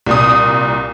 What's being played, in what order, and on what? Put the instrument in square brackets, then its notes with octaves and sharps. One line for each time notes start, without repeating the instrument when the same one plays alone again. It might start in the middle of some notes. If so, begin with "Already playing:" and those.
[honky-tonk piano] C2 A#2 D#6